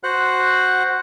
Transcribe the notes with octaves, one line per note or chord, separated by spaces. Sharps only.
F#4 C5 F#5 F#6